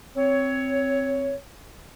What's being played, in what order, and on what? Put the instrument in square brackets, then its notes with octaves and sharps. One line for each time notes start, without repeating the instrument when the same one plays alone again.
[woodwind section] C4 C#5